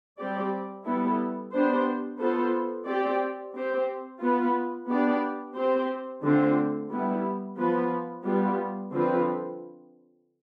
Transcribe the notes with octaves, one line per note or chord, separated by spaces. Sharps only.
G3 C4 G4 D5
G3 B3 E4 A4
B3 D4 G4 C5
B3 F4 A4 C5
C4 G4 D5
C4 G4 C5
B3 F4 B4
B3 D4 G4 D5
C4 G4 C5
D3 A3 C4 F4 C5
G3 B3 E4
F3 B3 F4 B4
G3 B3 F4
D3 F3 C4 F4 B4